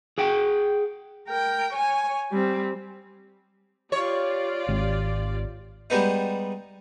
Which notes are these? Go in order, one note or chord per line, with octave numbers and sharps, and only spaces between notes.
G#4 F#5 G5
A#4 G5
C#5 G#5
G3 C4
F4 G4 C#5 D5
G#1
G3 G#3 B3 D#4